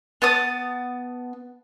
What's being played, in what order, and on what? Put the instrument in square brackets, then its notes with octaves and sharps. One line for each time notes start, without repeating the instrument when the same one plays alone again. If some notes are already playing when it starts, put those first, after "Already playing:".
[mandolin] B3 A5 D#6